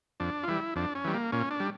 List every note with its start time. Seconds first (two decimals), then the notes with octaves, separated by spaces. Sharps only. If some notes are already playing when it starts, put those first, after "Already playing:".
0.20 F2 D4
0.43 F4
0.48 E3 G3 E4
0.76 F2 D4
0.95 C#4
1.04 E3 G3
1.14 A#3
1.32 A#2 C#4
1.51 D4
1.60 G3